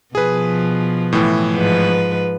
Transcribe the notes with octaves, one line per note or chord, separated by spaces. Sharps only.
B2 F3 G#4 B4
A2 E3
G#2 F3 B4